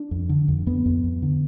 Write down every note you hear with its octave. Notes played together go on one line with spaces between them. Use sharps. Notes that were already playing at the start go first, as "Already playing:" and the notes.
Already playing: D4
F2
D3
F2
F2 B3
F2
F2
D3